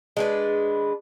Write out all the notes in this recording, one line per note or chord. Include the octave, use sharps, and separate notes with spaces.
G#3 D4 B4